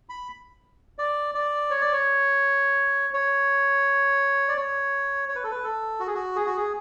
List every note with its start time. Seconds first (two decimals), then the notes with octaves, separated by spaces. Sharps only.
0.09 B5
0.99 D5
1.35 D5
1.70 C#5
1.81 D5
1.93 C#5
3.14 C#5
4.49 D5
4.57 C#5
5.29 C#5
5.36 B4
5.44 A4
5.51 B4
5.64 A4
6.00 F#4
6.07 G#4
6.14 F#4
6.36 G#4
6.46 F#4
6.57 G#4